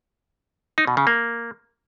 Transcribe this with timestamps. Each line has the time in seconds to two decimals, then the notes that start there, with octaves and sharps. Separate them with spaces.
0.78 D#4
0.87 B2
0.97 C#3
1.07 A#3